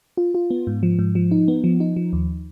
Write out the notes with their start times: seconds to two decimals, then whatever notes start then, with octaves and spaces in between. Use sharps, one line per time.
0.17 F4
0.35 F4
0.50 B3
0.67 G#2
0.83 F3
0.99 G#2
1.15 F3
1.31 D#4
1.48 B3
1.64 F3
1.80 D#4
1.96 F3
2.13 D#2